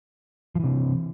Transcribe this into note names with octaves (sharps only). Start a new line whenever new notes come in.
C3 E3 F3